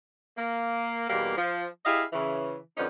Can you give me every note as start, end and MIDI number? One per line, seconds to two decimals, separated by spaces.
0.37 1.08 58
1.09 1.34 40
1.09 1.34 47
1.09 1.34 55
1.09 1.34 58
1.36 1.67 53
1.85 2.03 64
1.85 2.03 67
1.85 2.03 68
1.85 2.03 75
1.85 2.03 77
2.12 2.57 49
2.12 2.57 52
2.77 2.86 41
2.77 2.86 50
2.77 2.86 59
2.77 2.86 61
2.77 2.86 63